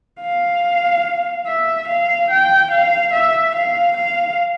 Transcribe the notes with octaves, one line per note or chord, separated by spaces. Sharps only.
F5
E5
F5
G5
F5
E5
F5
F5